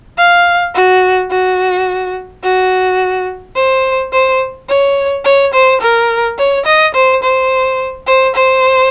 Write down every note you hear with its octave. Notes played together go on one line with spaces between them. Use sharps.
F5
F#4
F#4
F#4
C5
C5
C#5
C#5
C5
A#4
C#5
D#5
C5
C5
C5
C5